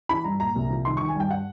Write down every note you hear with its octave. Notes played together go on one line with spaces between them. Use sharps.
E3 B5
G2 A#5
A#2 A#5
C2
F3
D#3 C6
D#3 C#6
G#5
G2 G5
F#5